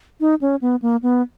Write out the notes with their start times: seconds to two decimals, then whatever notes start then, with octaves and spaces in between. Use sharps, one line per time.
0.20 D#4
0.41 C#4
0.61 B3
0.82 A#3
1.03 B3